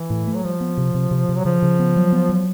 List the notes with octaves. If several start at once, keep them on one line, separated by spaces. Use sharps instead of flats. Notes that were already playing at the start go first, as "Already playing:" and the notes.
Already playing: E3
A2
A3
F#3
F3 G3
B3
C3
C3
C3
C3
F#3
C#3 F3
C#3
B3
F#3
B3
F#3